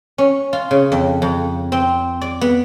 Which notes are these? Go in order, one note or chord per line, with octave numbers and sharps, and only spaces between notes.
C#4
F4
C#3
F2
F2
C4
D5
B3